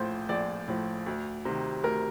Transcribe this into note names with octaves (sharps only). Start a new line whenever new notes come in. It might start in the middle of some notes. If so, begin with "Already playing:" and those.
Already playing: A#1 A2 F3 C5
A#1 D5
A2 F3
D2
C3 D#3
D2 A#4